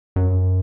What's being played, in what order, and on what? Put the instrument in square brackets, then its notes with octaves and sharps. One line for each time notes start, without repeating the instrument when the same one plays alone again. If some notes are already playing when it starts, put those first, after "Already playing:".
[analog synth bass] F#2